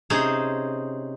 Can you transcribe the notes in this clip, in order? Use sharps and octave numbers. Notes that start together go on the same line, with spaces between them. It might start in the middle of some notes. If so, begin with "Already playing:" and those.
C3 C#4 D#4 G#4 C5